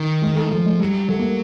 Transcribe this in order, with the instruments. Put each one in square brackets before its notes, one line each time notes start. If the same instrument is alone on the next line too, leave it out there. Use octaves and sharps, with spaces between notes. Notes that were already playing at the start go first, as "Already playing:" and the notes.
Already playing: [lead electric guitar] D#3
[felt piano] G#3
A3
[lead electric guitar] F3 [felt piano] A3
[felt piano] G#3
[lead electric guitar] F#3 [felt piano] G3
[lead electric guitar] F#3 [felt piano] A3
[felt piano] A#3